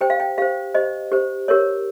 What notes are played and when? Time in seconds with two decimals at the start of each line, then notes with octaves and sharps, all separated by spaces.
0.01 G4 C5 G5
0.10 F5
0.20 G5
0.38 G4 C5 F5
0.74 G4 C5 D#5
1.12 G4 C5
1.48 G4 A#4 C#5